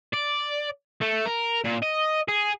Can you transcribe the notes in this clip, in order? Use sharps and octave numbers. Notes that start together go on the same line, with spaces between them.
D5
A3
A#4
A#2
D#5
G#4